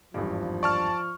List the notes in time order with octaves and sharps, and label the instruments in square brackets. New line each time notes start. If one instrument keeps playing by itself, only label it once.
[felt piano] G#1 E2 G2 [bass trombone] F3
[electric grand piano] D5 A5 F6 [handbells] C#6